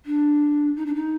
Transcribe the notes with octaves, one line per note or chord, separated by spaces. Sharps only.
D4
D#4
D4
D#4